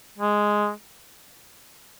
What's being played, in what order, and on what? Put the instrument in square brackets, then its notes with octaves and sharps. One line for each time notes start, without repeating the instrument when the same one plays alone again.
[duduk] G#3